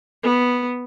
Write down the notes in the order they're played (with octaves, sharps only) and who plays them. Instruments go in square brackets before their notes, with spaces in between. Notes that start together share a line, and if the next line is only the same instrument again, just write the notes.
[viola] B3